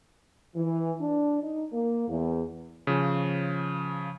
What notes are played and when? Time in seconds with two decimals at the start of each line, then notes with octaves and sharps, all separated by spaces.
0.55 E3
1.00 D4
1.43 D#4
1.73 A#3
2.08 E2
2.87 C#3 F3